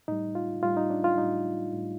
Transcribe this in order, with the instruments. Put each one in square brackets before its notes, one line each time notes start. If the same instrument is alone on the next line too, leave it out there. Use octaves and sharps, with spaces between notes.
[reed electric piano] A2 G3 D#4
F4
A2 G3 F4
D#4
D4
F4
A2 G3 D#4
A2 G3